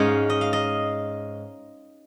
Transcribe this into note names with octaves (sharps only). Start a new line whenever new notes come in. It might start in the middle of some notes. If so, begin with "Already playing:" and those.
Already playing: G#2 G#3 C#4 D#5 F5
D#5
F5
D#5